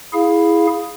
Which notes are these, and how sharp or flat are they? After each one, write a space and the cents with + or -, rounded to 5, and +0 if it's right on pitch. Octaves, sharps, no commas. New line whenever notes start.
E4 +0 G#4 +0 F5 +10